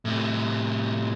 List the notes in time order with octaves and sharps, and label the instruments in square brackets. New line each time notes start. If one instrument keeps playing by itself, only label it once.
[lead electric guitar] A2 C3